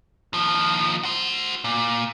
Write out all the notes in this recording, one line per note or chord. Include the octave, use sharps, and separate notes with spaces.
D#2 F3
F#4 C5
A#2